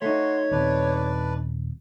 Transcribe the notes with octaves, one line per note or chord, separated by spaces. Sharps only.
A3 D#4 F#4 C#5 C6
D#1 B3 C4 D4 B4 D5